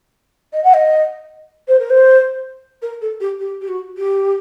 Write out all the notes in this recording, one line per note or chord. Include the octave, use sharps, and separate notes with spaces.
D#5
F#5
D#5
C5
A#4
C5
A#4
A4
G4
G4
G4
F#4
G4